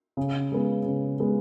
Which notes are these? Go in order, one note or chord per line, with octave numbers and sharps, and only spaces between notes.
C#3
G#3 B3
C#3
G#3 B3